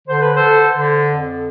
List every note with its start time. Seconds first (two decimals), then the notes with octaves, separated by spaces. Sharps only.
0.08 D3 C5
0.22 B4
0.36 A4 C5
0.43 D3
0.76 D3
1.11 F2